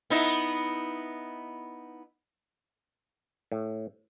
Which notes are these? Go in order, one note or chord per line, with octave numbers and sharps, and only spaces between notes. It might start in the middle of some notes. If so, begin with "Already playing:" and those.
B3 D#4 E4
A2